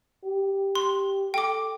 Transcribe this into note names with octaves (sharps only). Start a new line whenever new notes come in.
G4
C6
A4 G5 D6